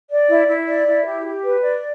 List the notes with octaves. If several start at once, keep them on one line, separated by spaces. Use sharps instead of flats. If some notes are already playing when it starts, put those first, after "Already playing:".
D5
E4
E4
D5
E4
G4
G4
B4
D5